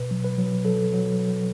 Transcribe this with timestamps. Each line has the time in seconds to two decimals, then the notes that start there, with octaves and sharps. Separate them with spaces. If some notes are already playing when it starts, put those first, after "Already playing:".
Already playing: B2 B4
0.11 F#3
0.24 B4
0.38 F#3
0.65 F#3 A4
0.93 F#3
1.19 F#3